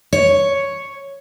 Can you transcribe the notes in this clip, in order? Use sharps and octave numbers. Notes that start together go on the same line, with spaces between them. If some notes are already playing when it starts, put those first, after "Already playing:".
C#5